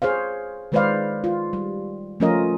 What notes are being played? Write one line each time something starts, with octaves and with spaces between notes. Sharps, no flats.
G#4 C5 C#5 F5
D#3 G#3 B4 C5 D5 F5
F4
G3
F3 A3 C#4 F4 A#4 D#5